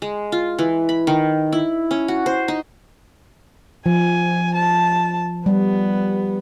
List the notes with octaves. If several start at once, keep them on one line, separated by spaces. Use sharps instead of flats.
G#3
F4
E3
B5
D#3
E4
C#4
F#4
C5
D#4
F3 G#5
A5
G3 B3